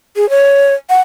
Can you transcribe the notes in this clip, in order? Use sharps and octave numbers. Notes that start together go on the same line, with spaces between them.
G#4
C#5
F#5